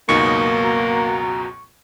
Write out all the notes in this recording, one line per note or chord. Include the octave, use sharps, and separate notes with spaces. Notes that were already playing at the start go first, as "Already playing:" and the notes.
C#2 F#2 B2 A#3 D#4 C#6
F#4 A#5